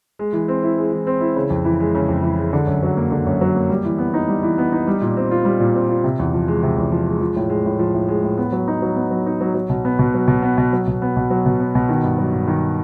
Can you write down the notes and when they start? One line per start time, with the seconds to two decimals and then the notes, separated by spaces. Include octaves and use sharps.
0.19 G#3
0.33 E3
0.48 C4
0.63 E4
0.78 G#3
0.92 E3
1.07 C4
1.21 E4
1.36 C#3
1.50 F2
1.65 E3
1.80 G#3
1.95 C#3
2.09 F2
2.23 E3
2.39 G#3
2.53 D3
2.67 F#2
2.83 F#3
2.97 A#3
3.12 D3
3.27 F#2
3.41 F#3
3.56 A#3
3.69 G3
3.85 E3
3.98 B3
4.14 D#4
4.28 G3
4.43 E3
4.58 B3
4.72 D#4
4.87 G3
5.01 A#2
5.17 C4
5.31 F4
5.45 G3
5.60 A#2
5.74 C4
5.89 F4
6.04 C3
6.19 E2
6.34 F3
6.48 G#3
6.63 C3
6.78 E2
6.92 F3
7.07 G#3
7.20 F3
7.36 A2
7.50 G#3
7.65 A2
7.79 F3
7.94 A2
8.08 G#3
8.23 A2
8.38 B3
8.52 F#3
8.68 D#4
8.82 F#3
8.96 B3
9.11 F#3
9.26 D#4
9.41 F#3
9.54 F#3
9.69 B2
9.85 B3
9.99 B2
10.14 F#3
10.28 B2
10.42 B3
10.58 B2
10.73 F#3
10.87 B2
11.02 B3
11.16 B2
11.30 F#3
11.46 B2
11.60 B3
11.75 B2
11.89 D#3
12.04 G2
12.18 F#3
12.32 G2
12.47 D#3